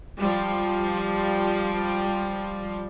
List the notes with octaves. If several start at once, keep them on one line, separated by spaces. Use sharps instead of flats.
F3 G3